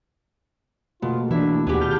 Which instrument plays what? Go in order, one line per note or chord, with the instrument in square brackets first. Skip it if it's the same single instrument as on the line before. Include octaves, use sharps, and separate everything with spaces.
[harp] B2 [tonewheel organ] A3 A#3 [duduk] F4
[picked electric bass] E3 [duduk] D4 [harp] E4
[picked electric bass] D#2 [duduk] A#2 [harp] B3 G4 [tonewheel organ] F#5 G#5
[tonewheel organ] A5 F6 G6